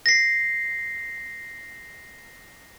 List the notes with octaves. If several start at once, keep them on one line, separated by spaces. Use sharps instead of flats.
A#6 C7